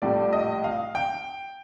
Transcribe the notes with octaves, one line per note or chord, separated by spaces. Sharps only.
A#1 A2 G3 D5
D#5
F5
G5